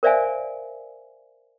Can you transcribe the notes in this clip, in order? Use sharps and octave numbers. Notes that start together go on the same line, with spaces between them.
A#4 C5 D5 E5 F5 G#5